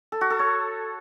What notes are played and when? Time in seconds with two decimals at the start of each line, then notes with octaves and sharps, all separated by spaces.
0.12 A4
0.21 F#4
0.30 A4
0.39 C#5